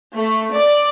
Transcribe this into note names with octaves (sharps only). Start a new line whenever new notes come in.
A3
D5